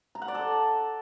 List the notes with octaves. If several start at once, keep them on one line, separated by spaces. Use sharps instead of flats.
A#5
F#5
D5
A4